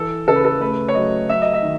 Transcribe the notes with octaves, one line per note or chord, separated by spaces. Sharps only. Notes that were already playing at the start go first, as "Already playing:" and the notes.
Already playing: E3 A4
C#3 A4
B4
A4
A3 B4
C#5
F#3 D#5
F#3 E5
D#5
E5
D#3